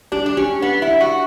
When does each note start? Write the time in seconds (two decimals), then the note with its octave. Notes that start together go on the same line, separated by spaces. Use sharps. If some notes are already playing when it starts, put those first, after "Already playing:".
0.12 D4 G4
0.26 D4
0.37 C#4 G4
0.62 B3 D4
0.82 E4
0.88 D4
1.00 F#4